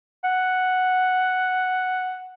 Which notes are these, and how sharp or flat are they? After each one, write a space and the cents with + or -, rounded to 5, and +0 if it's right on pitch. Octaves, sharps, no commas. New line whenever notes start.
F#5 +0